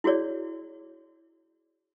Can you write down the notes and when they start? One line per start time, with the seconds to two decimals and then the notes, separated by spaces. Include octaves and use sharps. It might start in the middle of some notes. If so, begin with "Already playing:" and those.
0.04 E4 F#4 G#4 C#5 D5